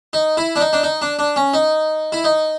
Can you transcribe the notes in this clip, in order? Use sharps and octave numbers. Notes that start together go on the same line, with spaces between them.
D#4
E4
D4
D#4
D4
D#4
D4
D4
C#4
D#4
E4
D#4